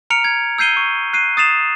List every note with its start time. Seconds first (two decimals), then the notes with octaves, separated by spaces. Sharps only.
0.10 A#5 F6 C#7 D7 F7
0.24 G#6
0.58 E6 G6 C7 D#7 G7
0.77 C#6
1.13 F#6 C7 D#7
1.37 D#6 A6 C7 E7 F7